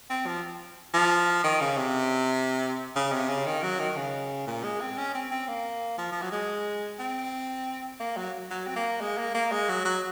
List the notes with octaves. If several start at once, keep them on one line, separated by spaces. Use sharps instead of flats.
C4
F3
F3
D#3
C#3
C3
C#3
C3
C#3
D#3
F#3
D#3
C#3
A#2
G#3
C4
C#4
C4
C4
A#3
F3
F3
F#3
G#3
C4
A#3
F#3
F#3
C4
A#3
G#3
A#3
A#3
G#3
F#3
F#3